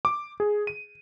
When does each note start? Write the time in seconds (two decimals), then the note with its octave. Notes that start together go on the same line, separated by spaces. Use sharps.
0.05 D6
0.40 G#4
0.67 D#7